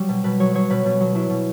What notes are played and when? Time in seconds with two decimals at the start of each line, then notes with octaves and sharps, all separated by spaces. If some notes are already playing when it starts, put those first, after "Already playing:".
Already playing: F#3 G3 C#5
0.09 B2
0.24 B2 B4
0.40 F#3 C#5
0.55 F#3 C#5
0.70 B2 B4
0.86 B2
1.00 F#3
1.15 F#3 E4
1.30 B2